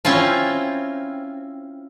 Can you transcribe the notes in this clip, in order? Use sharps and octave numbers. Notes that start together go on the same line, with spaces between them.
C4 C#4 E4 F4